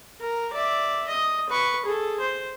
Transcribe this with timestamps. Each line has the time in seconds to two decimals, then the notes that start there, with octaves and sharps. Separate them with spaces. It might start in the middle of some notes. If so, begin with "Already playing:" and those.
0.20 A#4
0.53 D5 E5
1.08 D#5
1.49 B4 C#6
1.85 G#4 A4
2.20 C5